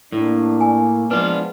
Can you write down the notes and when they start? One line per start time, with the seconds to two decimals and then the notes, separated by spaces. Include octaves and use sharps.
0.12 A2 A#3 D4
0.61 G#5
1.11 F3 G#3 B3 D4 F4 B4